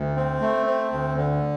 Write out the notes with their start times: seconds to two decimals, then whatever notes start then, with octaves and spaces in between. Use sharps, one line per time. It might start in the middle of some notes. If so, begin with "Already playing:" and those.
Already playing: D2
0.16 C4
0.41 A3
0.66 C4
0.92 D2
1.17 D3